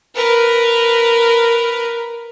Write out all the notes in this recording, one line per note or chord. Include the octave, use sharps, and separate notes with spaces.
A#4 B4